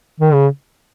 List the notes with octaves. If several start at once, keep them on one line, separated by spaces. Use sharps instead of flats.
D#3
C#3